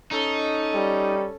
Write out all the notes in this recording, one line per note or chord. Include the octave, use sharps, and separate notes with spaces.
C#4 D#4 A4
G3